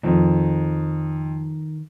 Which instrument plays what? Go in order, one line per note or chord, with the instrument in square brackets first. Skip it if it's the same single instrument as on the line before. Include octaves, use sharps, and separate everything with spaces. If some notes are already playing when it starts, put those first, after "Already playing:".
[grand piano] F2 [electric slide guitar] D#3